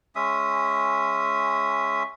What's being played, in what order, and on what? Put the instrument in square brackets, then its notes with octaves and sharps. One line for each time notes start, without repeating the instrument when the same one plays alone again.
[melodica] G#3 C#4 E5 D#6